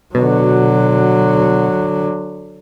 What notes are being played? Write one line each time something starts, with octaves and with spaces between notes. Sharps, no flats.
B2 D3 F#3